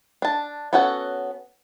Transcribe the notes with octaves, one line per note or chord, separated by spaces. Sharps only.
D4 A5
B3 C#4 F#4 A4 F#5